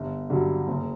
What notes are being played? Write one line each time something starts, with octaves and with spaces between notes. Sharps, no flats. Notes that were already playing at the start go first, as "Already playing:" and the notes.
Already playing: G1
G2 D3 F#3
F#1